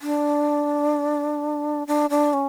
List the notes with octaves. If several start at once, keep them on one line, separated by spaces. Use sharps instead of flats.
D4
D4
D4
C#4